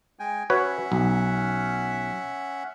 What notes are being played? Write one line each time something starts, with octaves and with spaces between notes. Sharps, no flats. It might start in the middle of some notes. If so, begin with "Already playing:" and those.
G#3 G5 G#5
C#4 F#4 B4 C#5 E5 F#5
B1